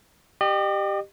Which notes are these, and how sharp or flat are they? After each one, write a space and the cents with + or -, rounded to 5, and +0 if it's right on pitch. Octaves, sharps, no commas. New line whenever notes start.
G4 +0 D#5 -40